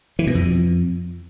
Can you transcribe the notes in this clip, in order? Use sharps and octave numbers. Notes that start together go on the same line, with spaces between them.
E3
B2
F2